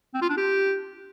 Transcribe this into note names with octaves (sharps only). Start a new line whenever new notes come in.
C4
F4
D4
G4